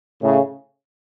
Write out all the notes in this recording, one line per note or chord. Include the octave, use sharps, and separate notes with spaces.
A2 C#3